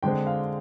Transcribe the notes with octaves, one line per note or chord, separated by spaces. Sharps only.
D3 G#3 C4 G5
F5